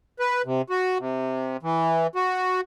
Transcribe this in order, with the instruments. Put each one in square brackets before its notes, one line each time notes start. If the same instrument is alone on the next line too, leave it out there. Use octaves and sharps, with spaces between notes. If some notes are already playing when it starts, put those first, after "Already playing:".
[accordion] B4
C3
F#4
C3
E3
F#4